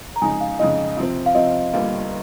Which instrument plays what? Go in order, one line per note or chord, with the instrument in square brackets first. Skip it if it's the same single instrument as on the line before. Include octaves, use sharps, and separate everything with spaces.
[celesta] A#5
[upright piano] F2 C#3 G#3 D#4 [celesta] G#5
[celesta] F5
[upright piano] F2 C#3 G#3 D#4 [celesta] D#5
[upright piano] C3 F3 C4
[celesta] F5
[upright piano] C3 F3 C4 [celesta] D#5
[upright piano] G1 G2 G3 A#3 F4